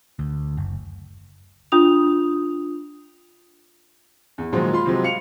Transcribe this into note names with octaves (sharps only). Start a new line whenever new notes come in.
D2
F#1
D4 F4 D#6 F7
E2
A#2 D#3 F3 F#3 G#3
F4 B5 C6
C3 F3 F#3 G#3
F5 C#7 F7